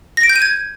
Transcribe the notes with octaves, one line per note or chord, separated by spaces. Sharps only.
A#6
D7
G6
D#7
G#6